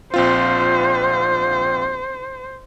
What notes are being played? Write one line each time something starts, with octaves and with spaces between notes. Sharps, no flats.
A#1 C4 F4 C5